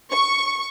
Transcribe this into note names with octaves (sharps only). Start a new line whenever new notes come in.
C#6